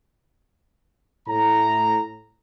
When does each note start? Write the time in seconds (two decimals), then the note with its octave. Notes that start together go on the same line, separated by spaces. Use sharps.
1.28 A2 A#5